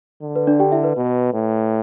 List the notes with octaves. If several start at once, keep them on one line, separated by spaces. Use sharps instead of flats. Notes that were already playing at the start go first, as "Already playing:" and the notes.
D3
B4
D4 D5
G4 G5
E4 E5
B4
B2
A2